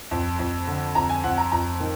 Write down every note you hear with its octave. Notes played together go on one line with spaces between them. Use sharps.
F2
F2
D3
F2 A#5
G#5
F2 F#5
A#5
F2 A#5
D#3